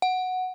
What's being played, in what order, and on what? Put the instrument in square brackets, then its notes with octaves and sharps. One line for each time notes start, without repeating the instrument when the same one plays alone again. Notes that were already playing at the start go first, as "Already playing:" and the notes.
[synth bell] F#5